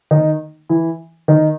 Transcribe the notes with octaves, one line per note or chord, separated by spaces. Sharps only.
D#3 D#4
E3 E4
D#3 D#4